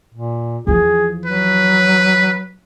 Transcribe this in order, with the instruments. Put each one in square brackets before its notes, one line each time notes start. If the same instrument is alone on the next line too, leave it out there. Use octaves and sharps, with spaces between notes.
[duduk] A#2
[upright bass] E2 F3 [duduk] G#4
[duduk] F#3 [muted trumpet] B4